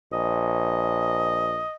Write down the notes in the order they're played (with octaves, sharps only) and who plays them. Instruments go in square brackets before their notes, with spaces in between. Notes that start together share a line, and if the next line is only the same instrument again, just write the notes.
[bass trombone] A#1 [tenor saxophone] D#5